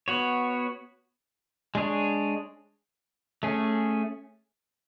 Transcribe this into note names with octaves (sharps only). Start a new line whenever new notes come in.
B3 F#4 C#5
G#3 D4 G#4 C#5
A3 C#4 G#4